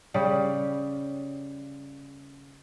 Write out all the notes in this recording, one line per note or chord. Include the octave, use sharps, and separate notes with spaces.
C#3 G3 G4